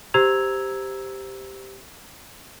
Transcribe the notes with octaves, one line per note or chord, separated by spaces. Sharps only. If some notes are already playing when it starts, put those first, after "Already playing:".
G4 C5 A#5 E6 G#6 F7